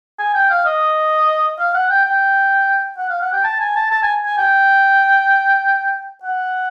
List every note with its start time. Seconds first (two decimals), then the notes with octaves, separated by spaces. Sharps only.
0.19 G#5
0.35 G5
0.50 F5
0.66 D#5
1.59 F5
1.74 F#5
1.89 G5
2.05 G5
2.98 F#5
3.10 F5
3.22 F#5
3.33 G5
3.44 A5
3.60 G#5
3.76 A5
3.91 A5
4.03 G#5
4.26 G#5
4.38 G5
6.24 F#5